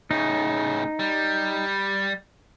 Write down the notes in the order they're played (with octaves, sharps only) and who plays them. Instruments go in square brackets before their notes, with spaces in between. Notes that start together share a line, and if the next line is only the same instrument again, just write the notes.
[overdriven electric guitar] A2 C#3 [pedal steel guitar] D#4
[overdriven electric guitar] G3